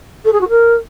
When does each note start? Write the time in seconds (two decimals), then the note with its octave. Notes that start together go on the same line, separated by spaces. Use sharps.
0.25 A4
0.33 G#4
0.41 F#4
0.49 A#4